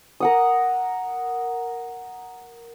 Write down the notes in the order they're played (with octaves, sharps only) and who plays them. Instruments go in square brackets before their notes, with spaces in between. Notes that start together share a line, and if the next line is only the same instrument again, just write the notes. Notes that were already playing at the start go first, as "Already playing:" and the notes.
[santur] A#4 F#5 D#6